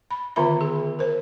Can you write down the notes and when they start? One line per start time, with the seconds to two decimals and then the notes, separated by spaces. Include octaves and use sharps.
0.11 B5
0.36 D3 D#3 B3 F4 E5 B5
0.61 G#4
0.99 A#4 C5